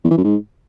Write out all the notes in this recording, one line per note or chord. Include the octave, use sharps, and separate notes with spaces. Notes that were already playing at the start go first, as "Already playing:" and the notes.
E2
E3
F#2
G#2